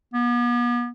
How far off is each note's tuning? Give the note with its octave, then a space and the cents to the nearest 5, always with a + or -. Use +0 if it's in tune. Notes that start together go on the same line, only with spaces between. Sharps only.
B3 -40